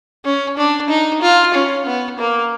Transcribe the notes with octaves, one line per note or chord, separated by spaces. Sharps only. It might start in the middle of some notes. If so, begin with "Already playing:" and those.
C#4
D4
D#4
F4
C#4
B3
A#3